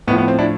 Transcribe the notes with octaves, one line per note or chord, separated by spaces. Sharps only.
A2 F3 B3
B3
C4
D4 E4